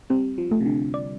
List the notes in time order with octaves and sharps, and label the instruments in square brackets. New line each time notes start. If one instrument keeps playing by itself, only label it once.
[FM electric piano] G3 [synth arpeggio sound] C4
[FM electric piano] F3
[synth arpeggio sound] A3
[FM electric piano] C3
D3
[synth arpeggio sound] D5